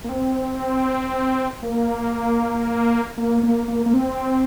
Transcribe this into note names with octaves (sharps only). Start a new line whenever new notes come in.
A#3
C4
A#3
A#3
A#3
A#3
A#3
C4